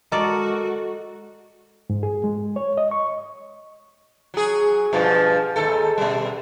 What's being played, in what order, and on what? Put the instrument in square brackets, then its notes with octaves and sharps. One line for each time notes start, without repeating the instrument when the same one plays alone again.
[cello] G#3 F#4 [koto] A4 D5 [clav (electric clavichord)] A#4 [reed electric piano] D#5
[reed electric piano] G#2
G#4
G#3
C#5
D#5
C#6
[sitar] F#3 G#4
G2 B2 F3
D#2 G#2 A4
B2 G3